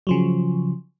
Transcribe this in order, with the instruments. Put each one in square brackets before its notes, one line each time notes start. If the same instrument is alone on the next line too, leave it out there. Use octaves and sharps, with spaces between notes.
[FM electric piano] C#3 F3 F#3